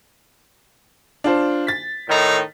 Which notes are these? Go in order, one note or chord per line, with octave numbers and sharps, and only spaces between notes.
D4 F4 C5
A6 B6
A2 D#3 D#4